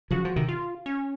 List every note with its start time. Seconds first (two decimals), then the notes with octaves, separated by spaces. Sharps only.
0.11 C#3 F3 F#4
0.25 F3
0.36 C3 D#3
0.48 F4
0.86 C#4